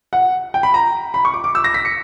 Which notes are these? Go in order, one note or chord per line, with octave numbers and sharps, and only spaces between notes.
F#5
G5
B5
A#5
B5
C#6
D6
D6
E6
A#6
B6
C#7